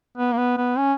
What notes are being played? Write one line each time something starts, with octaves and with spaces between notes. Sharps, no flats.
B3
A#3
B3
B3
C#4